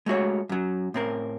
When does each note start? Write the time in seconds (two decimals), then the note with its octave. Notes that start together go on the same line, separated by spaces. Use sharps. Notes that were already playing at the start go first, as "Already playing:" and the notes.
0.06 G#3 A3 F#4 C#5
0.49 F#2 F#3
0.94 A2 C4 A#4